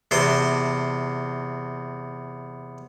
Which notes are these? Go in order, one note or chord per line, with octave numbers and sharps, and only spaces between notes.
E2 C3 C5 C6